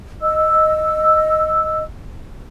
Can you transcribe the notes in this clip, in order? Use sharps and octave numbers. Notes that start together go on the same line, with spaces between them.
D#5 E6